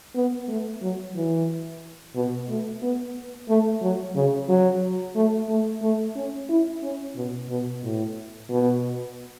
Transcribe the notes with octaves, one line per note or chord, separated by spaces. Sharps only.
B3
A3
F#3
E3
B2
A3
B3
A3
F#3
C#3
F#3
A3
A3
A3
C#4
E4
C#4
B2
B2
A2
B2